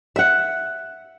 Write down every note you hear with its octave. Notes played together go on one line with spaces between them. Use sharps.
E5 F#5